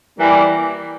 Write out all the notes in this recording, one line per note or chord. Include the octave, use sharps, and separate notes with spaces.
E3 G3 A#3